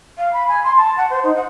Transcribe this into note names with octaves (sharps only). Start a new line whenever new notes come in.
F5
B5
G#5
C6
A5
F#5
C5
D#4
F#5